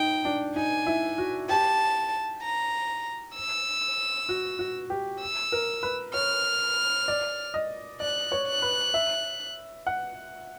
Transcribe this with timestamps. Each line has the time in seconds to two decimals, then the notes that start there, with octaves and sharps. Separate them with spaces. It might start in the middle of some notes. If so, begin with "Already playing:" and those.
Already playing: D#4 G5
0.25 D4
0.56 D#4 G#5
0.87 E4
1.18 F#4
1.49 G4 A5
2.42 A#5
3.36 E6
4.29 F#4
4.59 F#4
4.90 G4
5.21 E6
5.52 A#4
5.83 B4
6.14 C#5 F6
7.08 D5
7.54 D#5
8.00 D5 F#6
8.32 C#5
8.47 F#6
8.62 B4
8.94 E5
9.87 F#5